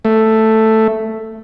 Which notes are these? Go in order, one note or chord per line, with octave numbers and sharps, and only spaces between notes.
A3